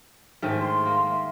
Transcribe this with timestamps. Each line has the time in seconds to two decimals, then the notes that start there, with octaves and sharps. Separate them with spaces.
0.42 G#2 D#3 A3
0.61 C6
0.86 A#3
1.11 E5